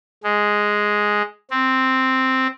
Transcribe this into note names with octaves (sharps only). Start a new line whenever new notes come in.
G#3
C4